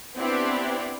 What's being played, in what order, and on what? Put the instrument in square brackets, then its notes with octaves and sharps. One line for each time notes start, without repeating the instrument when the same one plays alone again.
[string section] B3 C4 D4 E4 G4